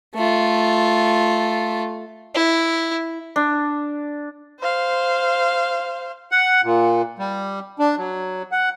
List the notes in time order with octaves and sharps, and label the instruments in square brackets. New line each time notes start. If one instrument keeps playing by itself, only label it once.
[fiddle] A3 F4
[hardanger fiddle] E4
[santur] D4
[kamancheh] C5 F5
[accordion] F#5
A#2
G3
D4
F#3
F#5